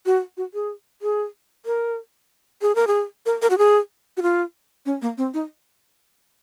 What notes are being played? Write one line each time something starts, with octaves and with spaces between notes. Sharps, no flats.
F#4
F#4
G#4
G#4
A#4
G#4
A#4
G#4
A#4
A#4
F#4
G#4
F#4
F4
C#4
A#3
C4
D#4